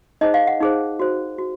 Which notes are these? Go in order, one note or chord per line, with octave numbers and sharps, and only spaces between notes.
D#4 G#4 C5 D#5
F5
F#5
D#4 G#4 C5
F#4 C5
F#4